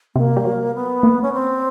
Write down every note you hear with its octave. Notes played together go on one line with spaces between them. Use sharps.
C3 A#3
G3
F#3
B3
A#3
C#4
C4